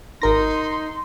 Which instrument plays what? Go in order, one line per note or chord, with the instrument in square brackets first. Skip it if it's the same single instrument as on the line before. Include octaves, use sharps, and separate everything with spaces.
[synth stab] G#1 A#4 A#6 [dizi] D#4 [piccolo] C6